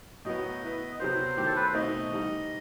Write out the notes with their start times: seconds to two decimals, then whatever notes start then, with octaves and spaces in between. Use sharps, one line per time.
0.25 A2 F#3 B3 D#5
0.63 B3 E4 B4
0.99 C3 F#3 B3 C5
1.37 D#3 F#3 A3 E4 G4
1.46 A4
1.56 B4
1.65 C5
1.74 B2 A3 C4 D#4 D#5
2.11 E3 G3 D#4